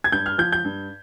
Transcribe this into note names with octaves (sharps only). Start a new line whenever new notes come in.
G#6
G2 G6
F6
F3 G6
G6
G2